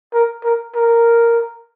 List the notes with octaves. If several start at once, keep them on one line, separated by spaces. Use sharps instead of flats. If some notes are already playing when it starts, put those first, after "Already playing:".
A#4
A#4
A#4